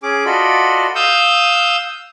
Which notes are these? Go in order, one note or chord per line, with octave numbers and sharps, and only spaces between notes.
C#4 G#4 D6
F4 F#4 A4 D5 D#5 B5
F5 D#6 E6 G6